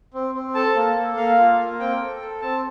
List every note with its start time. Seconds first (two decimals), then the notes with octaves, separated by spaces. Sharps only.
0.14 C4
0.35 C4
0.55 A4 A5
0.76 A#3
0.97 A4
1.17 A#3 F5
1.38 F4
1.59 A#3
1.80 C4 G5
2.01 A4
2.21 A4
2.42 C4 A5